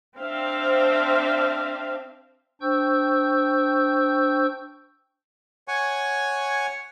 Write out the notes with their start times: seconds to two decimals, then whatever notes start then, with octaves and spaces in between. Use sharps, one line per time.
0.20 C4 D4 C5 E5 F5
2.61 D4 C5 G5 C#6 E6 G6
5.68 C#5 F#5 G#5 C#6